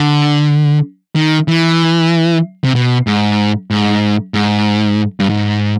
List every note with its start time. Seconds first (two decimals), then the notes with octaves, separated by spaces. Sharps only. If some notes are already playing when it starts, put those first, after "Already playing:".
Already playing: D3
1.16 D#3
1.48 E3
2.64 C3
2.75 B2
3.07 G#2
3.71 G#2
4.34 G#2
5.20 G2
5.30 G#2